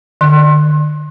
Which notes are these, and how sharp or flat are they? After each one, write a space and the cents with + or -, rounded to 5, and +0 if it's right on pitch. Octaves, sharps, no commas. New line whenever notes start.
D3 +40 C6 +35